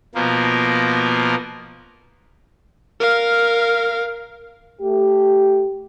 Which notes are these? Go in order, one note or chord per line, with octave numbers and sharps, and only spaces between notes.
B2 F3 A#3 A#4
A#4 F5
A3 G4